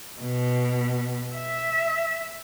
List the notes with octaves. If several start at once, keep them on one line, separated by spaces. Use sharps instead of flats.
B2
E5